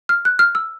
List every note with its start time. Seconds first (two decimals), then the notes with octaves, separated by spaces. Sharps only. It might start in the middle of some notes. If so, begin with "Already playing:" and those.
0.09 F6
0.25 F#6
0.39 F6
0.55 E6